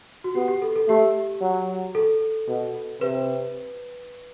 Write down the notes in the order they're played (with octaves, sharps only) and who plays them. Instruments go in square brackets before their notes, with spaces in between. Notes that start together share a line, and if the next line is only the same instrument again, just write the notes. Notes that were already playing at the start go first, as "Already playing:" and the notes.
[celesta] F#4
[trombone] B3 [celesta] G4
[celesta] G4
A4
A4
[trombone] A3 [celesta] G4
[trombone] F#3
[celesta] A4
[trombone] B2
[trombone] C3 [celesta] B4